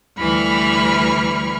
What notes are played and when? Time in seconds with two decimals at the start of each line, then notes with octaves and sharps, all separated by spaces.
0.17 D2 E3 G3 B5 C#6 F6